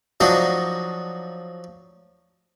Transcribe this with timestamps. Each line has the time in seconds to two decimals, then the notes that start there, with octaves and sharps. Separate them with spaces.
0.20 F3 F#3 D4 D#4 F#4 D#5